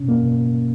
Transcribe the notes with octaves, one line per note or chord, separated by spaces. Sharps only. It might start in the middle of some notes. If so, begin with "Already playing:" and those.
Already playing: B2 C#4
A#3
B2